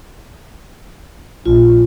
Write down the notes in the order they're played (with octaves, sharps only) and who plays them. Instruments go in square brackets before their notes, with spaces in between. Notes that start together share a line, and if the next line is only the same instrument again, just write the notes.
[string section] A#1 [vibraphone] F4